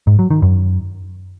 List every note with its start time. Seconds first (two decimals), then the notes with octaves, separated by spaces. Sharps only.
0.07 G#2
0.19 F#3
0.31 D#3
0.42 F#2